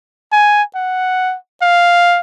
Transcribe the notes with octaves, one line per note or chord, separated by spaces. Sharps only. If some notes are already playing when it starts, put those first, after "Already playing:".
G#5
F#5
F5